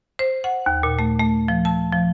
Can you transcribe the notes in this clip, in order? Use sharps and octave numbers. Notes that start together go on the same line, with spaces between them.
C5
F#5
D#2
A#2
A3
A3
F3
A5
F3